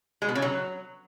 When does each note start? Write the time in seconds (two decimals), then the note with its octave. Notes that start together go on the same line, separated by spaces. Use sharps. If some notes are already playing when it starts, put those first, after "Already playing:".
0.22 G#3
0.29 B2
0.35 C#3
0.42 F#3